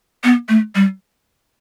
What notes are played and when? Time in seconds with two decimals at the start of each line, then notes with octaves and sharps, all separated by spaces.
0.24 B3
0.49 A3
0.75 G3